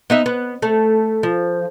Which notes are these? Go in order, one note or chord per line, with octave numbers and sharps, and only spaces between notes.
B3 D#4 E5
B3
A3
F3